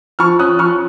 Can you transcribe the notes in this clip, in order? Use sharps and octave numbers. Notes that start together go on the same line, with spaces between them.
F3 C#6 F6
C#4 D#6 F#6
F3 C#6 F6